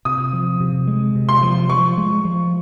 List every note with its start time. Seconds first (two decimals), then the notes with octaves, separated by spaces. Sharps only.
0.05 C3 D#6
0.33 F3
0.60 C3
0.88 G#3
1.16 C3
1.29 C6
1.42 F3
1.69 F3 C#6
1.98 G#3
2.25 F3